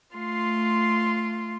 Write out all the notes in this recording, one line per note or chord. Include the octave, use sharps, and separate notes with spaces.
A3 F4 C6